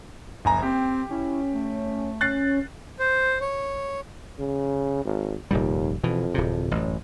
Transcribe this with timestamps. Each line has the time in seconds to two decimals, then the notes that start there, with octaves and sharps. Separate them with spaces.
0.45 F#1 F3 G#5 A#5
0.63 C4 G4
1.10 C#4 E4
1.54 A3
2.21 C#4 F#6 A6 C7
2.99 C5
3.41 C#5
4.38 C#3
5.05 G#1
5.51 F1 D#2 A#2 G3
6.04 F2 B2 E3
6.34 D1 C3
6.71 A1 F#2 C#4